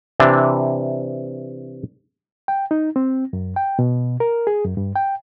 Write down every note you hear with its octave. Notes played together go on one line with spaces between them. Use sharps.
C3 E3 D4
G5
D#4
C4
F#2
G5
B2
A#4
G#4
F#2
G2
G5